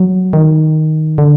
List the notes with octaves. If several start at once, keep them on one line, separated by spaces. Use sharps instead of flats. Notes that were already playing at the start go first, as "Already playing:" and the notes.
Already playing: F#3
D#3
D3